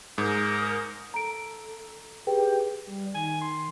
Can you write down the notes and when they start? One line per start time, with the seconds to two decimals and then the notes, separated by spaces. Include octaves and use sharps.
0.18 G#2 A#4 D#6
1.14 A4 A#5 D7
2.27 G4 G#4 B4 G5
2.86 G3
3.14 D#3 G#5
3.41 C6